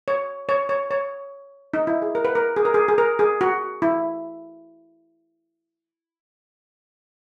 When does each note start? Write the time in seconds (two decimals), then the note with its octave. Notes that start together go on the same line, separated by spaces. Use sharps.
0.08 C#5
0.49 C#5
0.69 C#5
0.91 C#5
1.74 D#4
1.87 E4
2.02 G#4
2.15 A#4
2.25 B4
2.35 A#4
2.56 G#4
2.65 A#4
2.74 G#4
2.88 G#4
2.98 A#4
3.19 G#4
3.41 F#4
3.82 E4